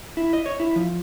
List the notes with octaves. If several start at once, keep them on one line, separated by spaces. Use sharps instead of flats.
E4
D#5
C#5
E4
F3